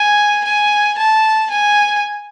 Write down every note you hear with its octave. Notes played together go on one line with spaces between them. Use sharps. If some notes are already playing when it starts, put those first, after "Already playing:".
Already playing: G#5
G#5
A5
G#5